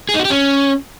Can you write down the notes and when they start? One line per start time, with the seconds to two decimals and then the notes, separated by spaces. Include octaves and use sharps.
0.09 G#4
0.14 D#4
0.19 F#4
0.25 G4
0.30 C#4